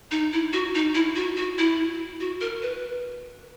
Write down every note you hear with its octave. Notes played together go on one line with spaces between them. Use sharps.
D#4
E4
F#4
D#4
E4
F#4
F#4
E4
F#4
A#4
B4